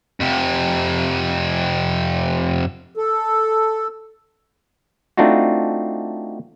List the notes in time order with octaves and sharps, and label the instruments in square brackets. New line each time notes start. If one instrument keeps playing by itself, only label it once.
[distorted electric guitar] F2 C3
[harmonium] A4
[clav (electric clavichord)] A3 C4 D4 D#4 F4 F#4